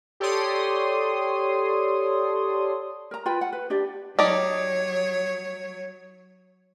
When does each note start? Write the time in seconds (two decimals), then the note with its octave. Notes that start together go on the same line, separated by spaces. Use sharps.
0.20 G4 A4 C#5 D5 C6 D#6
3.11 A#4 A#5
3.26 F4 B4 G5 B5
3.41 F#5
3.53 B4
3.70 D4 G4 D5
4.19 F#3 D#4 G4 C#5 D5